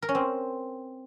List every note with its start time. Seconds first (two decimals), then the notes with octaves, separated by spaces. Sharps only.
0.02 A#4
0.09 C#4
0.15 C4